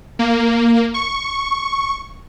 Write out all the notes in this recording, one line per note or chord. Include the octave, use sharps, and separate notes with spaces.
A#3
C#6